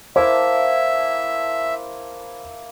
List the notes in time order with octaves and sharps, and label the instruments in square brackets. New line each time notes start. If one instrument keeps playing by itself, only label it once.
[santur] A#3 E4 A5 [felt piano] C5 [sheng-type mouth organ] E5